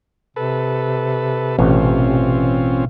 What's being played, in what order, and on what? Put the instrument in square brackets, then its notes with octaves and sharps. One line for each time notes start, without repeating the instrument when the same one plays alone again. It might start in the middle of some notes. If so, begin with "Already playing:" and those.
[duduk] C3 [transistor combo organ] A4 B4
[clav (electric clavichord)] A1 [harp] B2 [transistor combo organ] C4 C#4 F4